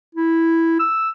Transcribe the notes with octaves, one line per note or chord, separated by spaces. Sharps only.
E4
E6